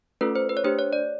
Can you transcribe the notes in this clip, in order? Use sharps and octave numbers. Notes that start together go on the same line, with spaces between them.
A3 C#4 F4 A4 B4
C5
B4
C#5
A3 D4 G4 C5
C#5
D5